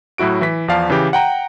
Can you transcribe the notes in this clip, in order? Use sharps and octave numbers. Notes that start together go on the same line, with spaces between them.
A2 F#3 E4 F#4 D7
E3 B6
E2 F3 D5 F5 A5
C#3 E3 G4
F#5 G5 A#5